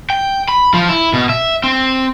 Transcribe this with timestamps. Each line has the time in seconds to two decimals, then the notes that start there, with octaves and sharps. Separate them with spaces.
0.10 G5
0.48 B5
0.74 F3
0.89 E4
1.13 B2
1.29 E5
1.64 C4